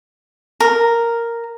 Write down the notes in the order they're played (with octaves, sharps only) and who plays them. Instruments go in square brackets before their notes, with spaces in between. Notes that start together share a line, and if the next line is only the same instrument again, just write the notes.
[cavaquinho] A#4